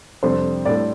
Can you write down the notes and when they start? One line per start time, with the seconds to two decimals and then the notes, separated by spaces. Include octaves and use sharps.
0.23 F2 C3 G3 D4 A4 C5
0.65 A2 G3 D4 A4 D5